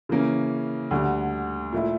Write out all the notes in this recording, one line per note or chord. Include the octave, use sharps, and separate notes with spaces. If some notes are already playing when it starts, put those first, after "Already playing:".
C#3 E3 A#3 C#4
D2 D3 G3
A#2 A3 E4